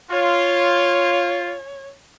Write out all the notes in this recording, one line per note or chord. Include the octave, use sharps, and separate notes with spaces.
F4 C#5